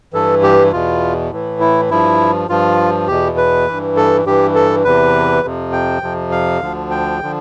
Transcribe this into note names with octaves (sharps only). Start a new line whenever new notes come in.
G2 E3 A4
G4
E2 B2 F4
A2 E3
E4
G2 F3 E4
G2 F3 F4
E2 B2 G4
B4
G2 E3
A4
G2 E3 G4
A4
E2 C3 E3 B4
F2 C3 F3
G5
F2 C3 F3
F5
D2 D3 F3
G5
D3 F3